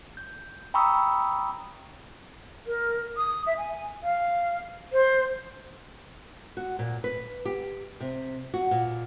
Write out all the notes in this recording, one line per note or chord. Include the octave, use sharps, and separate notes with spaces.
G6
G5 A#5 B5 C#6 D#6 E6
A#4
D#6
E5
G#5
F5
C5
F#4
A#2
B4
G4
C3
F#4
A#2